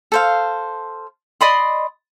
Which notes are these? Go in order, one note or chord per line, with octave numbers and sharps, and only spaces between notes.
A4 C5 F5
D5 D#5 B5 C6